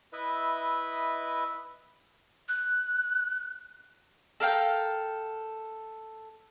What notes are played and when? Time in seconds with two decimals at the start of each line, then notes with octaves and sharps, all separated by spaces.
0.13 E4 B4 D#5 E5
2.49 F#6
4.40 A4 A#4 F5 G5